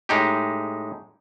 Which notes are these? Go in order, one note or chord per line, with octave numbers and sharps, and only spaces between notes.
A2 G#3 D#4 G4